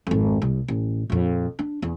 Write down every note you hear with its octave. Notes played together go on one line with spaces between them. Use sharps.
G#1 F2
C2
A1
A#1 F2
D4
E2